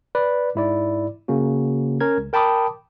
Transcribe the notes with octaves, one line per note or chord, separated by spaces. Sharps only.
B4 D5
G#2 E4 D5
C#3 A#3 C#4 F#4
C#4 A#4 G#6
C#2
A#4 G5 A5 B5 D6 D#6